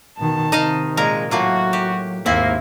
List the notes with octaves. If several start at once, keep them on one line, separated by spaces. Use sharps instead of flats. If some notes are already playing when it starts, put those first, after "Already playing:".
B2 D#3 A5
C3 D#3 D#4 D#5 F5
A#2 G#3 A#4 A#5
A2 F#3 A#3 F4 F#4
G4
D#2 G#2 A#3 C4 E4